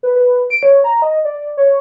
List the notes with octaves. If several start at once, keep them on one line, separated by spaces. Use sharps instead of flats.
B4
B4
D7
C#5
A#5
D#5
D5
C#5